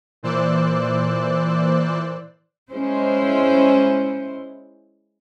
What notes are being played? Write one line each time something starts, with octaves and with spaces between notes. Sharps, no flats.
A#2 E3 C5 D5 E6 F#6
G#3 C#4 E4 C5